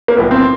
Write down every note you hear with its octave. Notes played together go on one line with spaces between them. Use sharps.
A#3
B1 A2 F3 B3
C4